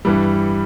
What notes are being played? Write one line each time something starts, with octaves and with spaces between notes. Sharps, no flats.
G2 E3 G3